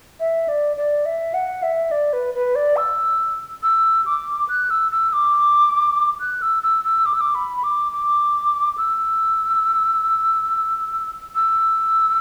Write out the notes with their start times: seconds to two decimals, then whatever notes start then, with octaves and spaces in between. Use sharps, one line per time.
0.20 E5
0.48 D5
0.77 D5
1.06 E5
1.34 F#5
1.63 E5
1.91 D5
2.13 B4
2.34 B4
2.55 D5
2.77 E6
3.63 E6
4.06 D6
4.49 F#6
4.70 E6
4.92 E6
5.13 D6
6.20 F#6
6.42 E6
6.63 E6
6.85 E6
7.06 D6
7.14 E6
7.21 D6
7.35 B5
7.57 B5
7.64 D6
7.92 D6
8.78 E6
11.35 E6